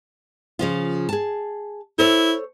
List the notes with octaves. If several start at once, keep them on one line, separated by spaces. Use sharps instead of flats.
C#3 F3 F4
G#4 A5
E4 A4 C5 C#5